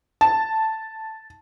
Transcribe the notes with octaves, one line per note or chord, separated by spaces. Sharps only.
A5